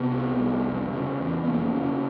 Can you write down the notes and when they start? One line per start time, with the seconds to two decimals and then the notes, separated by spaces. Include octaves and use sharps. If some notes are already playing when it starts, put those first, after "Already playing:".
Already playing: C3 B3
0.11 C2
0.38 C2
0.65 F1
0.93 C#3
1.20 E2
1.44 B3
1.47 F1 A#3
1.75 C#3